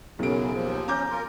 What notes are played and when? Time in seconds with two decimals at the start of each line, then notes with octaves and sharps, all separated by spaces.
0.19 B1 F#2 C#3 D7
0.54 D#2 F3
0.88 C#4 A#5 D6 G6
1.10 F4 A#4